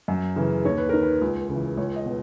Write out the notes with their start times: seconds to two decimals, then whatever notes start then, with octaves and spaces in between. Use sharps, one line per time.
0.08 F#2
0.36 C#3 E3
0.65 D#2 C#5
0.78 B4
0.89 D#3 A#4
1.03 B4
1.21 C#2
1.49 C#3 E3
1.77 C#2 C#5
1.96 D#5
2.06 B2